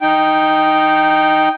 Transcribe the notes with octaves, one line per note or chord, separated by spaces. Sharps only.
D#4 G5